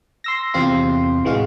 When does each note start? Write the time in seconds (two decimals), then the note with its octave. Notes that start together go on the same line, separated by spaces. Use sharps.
0.24 C6 E6 A#6
0.54 E2 C3 C4 F4 C6
1.24 A1 E3 G#3 F#4 F5